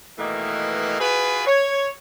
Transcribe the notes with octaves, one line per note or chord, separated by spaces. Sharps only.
B2 D#3 E3 A3 A#3
F4 F#4 G#4 B4
C#5